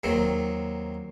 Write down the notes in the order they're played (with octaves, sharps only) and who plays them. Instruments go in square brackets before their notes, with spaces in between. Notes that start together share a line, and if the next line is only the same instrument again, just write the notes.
[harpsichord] D#2 D#3 F#3 C4